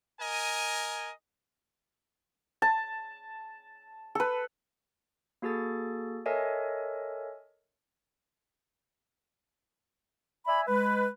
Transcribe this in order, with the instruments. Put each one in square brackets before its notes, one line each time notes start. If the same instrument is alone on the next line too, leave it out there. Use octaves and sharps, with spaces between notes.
[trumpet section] A#4 D#5 G#5
[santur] A5
A4 B4
[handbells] A#3 F#4 G#4 A4 A6
A4 A#4 C#5 D#5 E5 G#5
[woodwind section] D5 E5 G#5 B5
G#3 B4